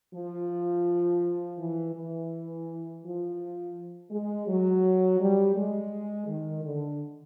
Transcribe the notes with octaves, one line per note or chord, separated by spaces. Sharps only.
F3
E3
E3
F3
G#3
F#3
G3
G#3
D#3
D3